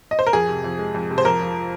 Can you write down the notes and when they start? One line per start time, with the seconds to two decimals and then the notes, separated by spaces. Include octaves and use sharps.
0.11 D#5
0.19 C5
0.27 A#4
0.33 F2 G#4
0.48 C3
0.64 F2
0.79 G#3
0.94 F2
1.10 C3
1.18 C5
1.25 F2 A#4
1.41 F3